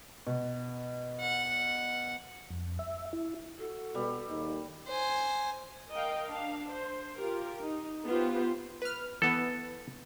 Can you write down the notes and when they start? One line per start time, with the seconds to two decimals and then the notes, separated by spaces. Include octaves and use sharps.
0.27 B2
1.20 F#5
2.50 F2
2.79 E5
3.13 E4
3.59 F#4 A4
3.95 B2 G3
4.28 D#2 D#4
4.87 C5 G#5
5.91 A#4 D#5 F5 G5
6.30 D4 F5
6.70 C5
7.17 F4 G4 A#4
7.60 D#4
8.06 B3 F4 G4 C5
8.82 B4 F6
9.22 E3 B3 A4